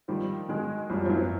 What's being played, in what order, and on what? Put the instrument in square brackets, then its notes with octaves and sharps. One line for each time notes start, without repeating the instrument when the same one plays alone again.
[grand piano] D#3 [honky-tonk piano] F3 G3
[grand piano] D#3 [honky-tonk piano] F#3 G#3
[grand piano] F#2 [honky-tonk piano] F3 G3
[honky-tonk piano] F3
E3 F#3